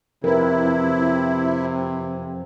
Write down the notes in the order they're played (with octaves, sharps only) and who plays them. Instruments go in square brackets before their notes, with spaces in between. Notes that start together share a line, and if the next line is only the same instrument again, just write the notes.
[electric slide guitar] F2 [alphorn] C3 [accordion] E4 [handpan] A#4 B4